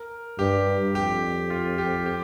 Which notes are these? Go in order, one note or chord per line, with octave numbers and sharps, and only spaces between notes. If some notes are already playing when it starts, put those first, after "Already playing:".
Already playing: A#4
G2 G4
F2 G4
F4
G4
G4